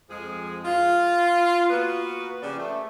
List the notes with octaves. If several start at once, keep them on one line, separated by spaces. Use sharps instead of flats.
F2 F3 G#3 G#4
F4
A#3 B3 F#4 B4
C#3 F3 G4 D5
A3